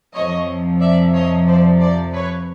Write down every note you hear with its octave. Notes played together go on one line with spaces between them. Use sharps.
F2 C3 F3 C#5 D#5
D5 E5
C#5 D#5
C5 D5
C5 D5
B4 C#5